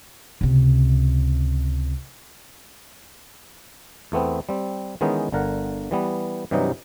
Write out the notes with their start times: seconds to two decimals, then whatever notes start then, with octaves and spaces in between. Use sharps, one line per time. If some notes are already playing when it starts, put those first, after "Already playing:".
0.41 C#2 C3
4.12 E2 A3 B3 C4
4.49 G3 C4
5.01 D#3 E3 G#3 B3 C#4 D#4
5.32 G1 D3 A#4 F#5
5.91 E3 G3 B3
6.51 G2 C3 E3 F#3 D#4